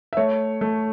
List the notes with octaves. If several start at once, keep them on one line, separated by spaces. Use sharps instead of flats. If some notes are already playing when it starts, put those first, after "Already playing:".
E5
A3 C#5
A3